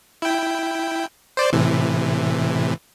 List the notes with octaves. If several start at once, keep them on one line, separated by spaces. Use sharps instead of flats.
E4 G5
C5 D5
A2 C3 E3